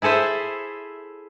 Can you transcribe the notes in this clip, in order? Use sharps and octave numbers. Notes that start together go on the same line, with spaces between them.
E4 G#4 A4 C5 E5